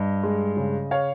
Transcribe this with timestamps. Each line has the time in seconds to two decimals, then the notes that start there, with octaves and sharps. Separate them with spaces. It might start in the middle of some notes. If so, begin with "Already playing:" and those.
Already playing: G2 D#5
0.23 G#3
0.57 C#3
0.91 C#5 F5